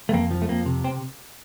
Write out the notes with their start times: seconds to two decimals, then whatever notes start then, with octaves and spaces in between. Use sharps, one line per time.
0.09 A3
0.13 F2 A#3
0.31 F3
0.42 A3
0.49 F2 A#3
0.66 C3
0.84 C4